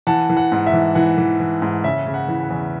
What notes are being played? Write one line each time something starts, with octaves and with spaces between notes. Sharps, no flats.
E3 F#5 A5
E3
F#5
G#2
E5
E3
E3 F#5
E3
E3
G#2
C#3 E5
C#3
F#5
E3
F#5
E2